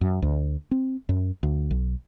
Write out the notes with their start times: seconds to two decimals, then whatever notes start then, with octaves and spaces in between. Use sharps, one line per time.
0.01 F#2
0.22 D2
0.71 C4
1.09 F#2
1.43 D2
1.71 B1